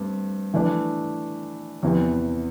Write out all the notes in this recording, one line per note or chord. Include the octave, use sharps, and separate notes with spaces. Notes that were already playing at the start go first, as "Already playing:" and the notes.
Already playing: G2 A3 C4
E3 A3 D4
E2 C3 E3